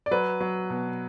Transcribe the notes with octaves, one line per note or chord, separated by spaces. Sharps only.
D5
F#3 B4
F#3
B2